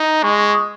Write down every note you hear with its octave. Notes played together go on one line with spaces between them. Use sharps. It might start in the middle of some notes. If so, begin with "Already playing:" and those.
Already playing: D#4
G#3 C#6
C#6
C#6
D#6